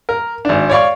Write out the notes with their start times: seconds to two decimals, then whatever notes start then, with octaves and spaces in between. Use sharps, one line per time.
0.09 A#4
0.45 G#1 D4
0.70 C#5 D5 F5 C#6